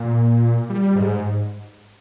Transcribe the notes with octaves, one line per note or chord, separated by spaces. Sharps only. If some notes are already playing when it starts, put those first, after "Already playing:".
Already playing: A#2
G3
G#2